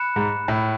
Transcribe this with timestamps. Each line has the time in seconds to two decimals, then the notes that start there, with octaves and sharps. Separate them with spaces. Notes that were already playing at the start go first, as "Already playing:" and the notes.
Already playing: B5 F#6 C#7 E7
0.16 G#2
0.48 A2